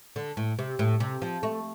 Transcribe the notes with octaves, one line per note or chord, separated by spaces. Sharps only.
D3
A2
C3
A2
C3
F3
A3